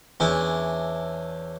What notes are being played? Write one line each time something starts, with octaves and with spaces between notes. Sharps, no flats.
E2 C#4 D4 E4